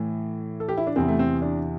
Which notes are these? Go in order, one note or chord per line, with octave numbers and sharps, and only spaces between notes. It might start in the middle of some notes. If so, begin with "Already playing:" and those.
Already playing: A2 E3
A4
G4
E4
D4
E2 C3 E3 C4
A3
C4
D4